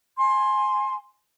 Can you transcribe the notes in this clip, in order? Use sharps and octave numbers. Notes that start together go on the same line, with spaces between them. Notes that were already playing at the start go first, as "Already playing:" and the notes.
G#5 C6